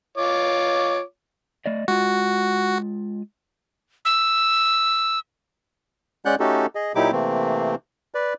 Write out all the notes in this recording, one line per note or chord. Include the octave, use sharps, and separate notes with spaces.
F4 C#5 D6
A3 D5 D#5
G#3 F4 F#4
E6
G#3 C#4 D5 F#5 F#6 G6
A3 C#4 D#4 F#4 G4 A4
G#4 D#5
A#2 F#3 D#4 E4 G4 D6
C3 E3 A3 A#3 C4
B4 D5